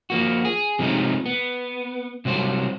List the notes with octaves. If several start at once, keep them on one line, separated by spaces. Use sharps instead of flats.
F3 A#3 F#4
G#4
C3 F3 F#3 G#3 A3 D#4
B3
C3 F#3 G3 C5